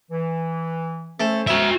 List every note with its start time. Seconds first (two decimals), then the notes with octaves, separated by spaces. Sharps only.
0.11 E3
1.20 A3 C#4 A4 C5
1.47 E4 F#4 E5